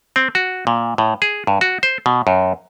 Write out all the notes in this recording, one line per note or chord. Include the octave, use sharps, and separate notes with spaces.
C4
F#4
A#2
A2
G#4
G2
F#4
C5
B2
F#2